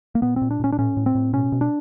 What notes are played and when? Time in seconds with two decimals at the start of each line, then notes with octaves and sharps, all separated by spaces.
0.15 A#3
0.22 A#2 B3
0.36 C4
0.42 A#2
0.51 D4
0.60 A#2 C#4
0.72 D4
0.78 A2 C#4
0.97 A2
1.06 C4
1.15 A2
1.33 B2 C#4
1.52 B2
1.61 D4